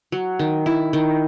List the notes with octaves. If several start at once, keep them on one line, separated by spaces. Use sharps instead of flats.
F#3
D#3
E4
D#3